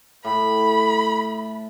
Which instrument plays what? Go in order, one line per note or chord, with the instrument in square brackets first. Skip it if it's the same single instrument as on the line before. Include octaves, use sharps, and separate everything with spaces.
[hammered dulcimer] A2 [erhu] B5